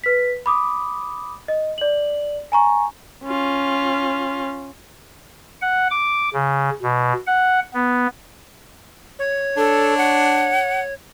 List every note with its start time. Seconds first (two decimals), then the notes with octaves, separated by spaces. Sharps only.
0.04 B4 B6
0.46 B5 D6 D#6
1.48 D#5
1.78 D5 F#7
2.52 G#5 A#5 C#6
3.25 C#4 F4
5.62 F#5
5.91 D6
6.33 C#3
6.83 B2
7.27 F#5
7.74 B3
9.19 C#5
9.57 D4 A4
9.98 F#5